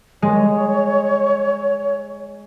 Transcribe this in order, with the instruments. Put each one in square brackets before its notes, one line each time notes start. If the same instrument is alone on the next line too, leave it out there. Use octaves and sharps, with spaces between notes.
[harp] G#3 [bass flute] C#5